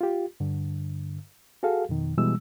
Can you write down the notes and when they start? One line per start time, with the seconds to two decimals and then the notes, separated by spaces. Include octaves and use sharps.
0.01 F4 G4
0.40 G2 D3
1.63 F#4 G#4 A4 F5
1.89 F2 B2 D#3
2.18 B2 E3 G3 G#3 E6